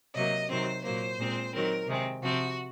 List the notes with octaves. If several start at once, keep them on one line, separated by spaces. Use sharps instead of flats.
C3 F#3 A#3 D#5
C3 D#3 F#3 C4 C5
A#2 F#3 A#3 C5
A#2 G#3 C4
D#3 F#3 C4 A#4
C3 D#3 G#3 C4
C3 F3 C4 F#4